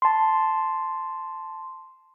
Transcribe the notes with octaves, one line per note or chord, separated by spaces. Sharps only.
A5 C6